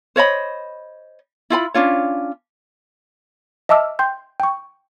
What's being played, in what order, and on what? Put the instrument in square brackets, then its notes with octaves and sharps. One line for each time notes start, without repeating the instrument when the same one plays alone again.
[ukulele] C5 C#5 D#5 B5
E4 F4 G5 B5
C#4 D4 F4 C#5
[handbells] D#5 E5 A5 D6 E6 F6
G5 C6 G6
G5 C#6